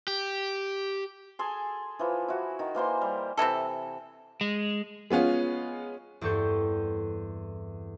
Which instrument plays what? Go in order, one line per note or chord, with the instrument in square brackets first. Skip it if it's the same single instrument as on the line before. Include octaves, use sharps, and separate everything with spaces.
[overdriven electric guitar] G4
[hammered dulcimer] G#4 A4 G#5 C6
E3 F3
E4 F#4
D#3
E3 A#3 C5 C6
G3
[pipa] C3 E3 G#3 A4
[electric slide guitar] G#3
[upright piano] G#3 B3 C#4 F4
[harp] E2 G2 C4 A4 C#6 G6